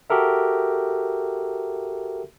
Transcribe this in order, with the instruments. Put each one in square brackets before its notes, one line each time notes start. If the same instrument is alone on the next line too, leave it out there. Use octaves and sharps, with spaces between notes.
[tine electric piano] F#4 G4 A4 A#4 E5